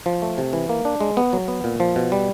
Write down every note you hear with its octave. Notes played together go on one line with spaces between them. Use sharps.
F3
A3
C3
E3
A#3
D4
G#3
B3
F#3
B3
A#2
F3
B2
G3